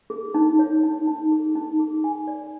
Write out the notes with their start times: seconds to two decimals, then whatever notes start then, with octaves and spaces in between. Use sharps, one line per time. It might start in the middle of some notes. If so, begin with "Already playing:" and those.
0.10 G#4
0.34 D#4
0.59 C#5
0.83 D#4
1.08 D#4
1.31 G#4
1.55 D#4
1.79 G#4
2.04 G#5
2.28 D5